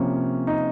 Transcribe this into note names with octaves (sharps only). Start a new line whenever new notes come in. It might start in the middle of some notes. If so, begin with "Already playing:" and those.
Already playing: C3 F3 A#3 C#4
D#4